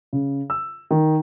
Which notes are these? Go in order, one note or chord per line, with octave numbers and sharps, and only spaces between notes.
C#3
E6
D#3